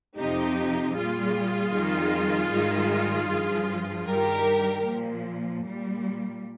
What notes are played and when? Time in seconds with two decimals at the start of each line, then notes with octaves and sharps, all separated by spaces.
0.15 F2 C3 F3 D#4 G4
0.94 A#2 G3 F4 G#4
1.73 F2 D#3 G3
2.51 G#2 D#3 G3
3.29 G2 F3
4.07 G2 D#3 G3 G4 A#4
4.86 A#2 F3
5.64 A#2 G3